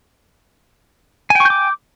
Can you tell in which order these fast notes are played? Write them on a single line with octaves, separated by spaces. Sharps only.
G#5 G5 C#6 G6 D6